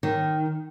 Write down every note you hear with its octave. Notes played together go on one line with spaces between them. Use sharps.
D#3